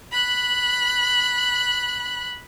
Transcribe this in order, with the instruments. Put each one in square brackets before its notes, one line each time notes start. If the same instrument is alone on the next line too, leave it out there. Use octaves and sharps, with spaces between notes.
[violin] B5 F#6